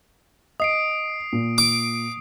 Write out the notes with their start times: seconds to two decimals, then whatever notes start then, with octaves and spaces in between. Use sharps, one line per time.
0.60 D#5 D#6 C7 D7
1.33 A#2
1.58 D6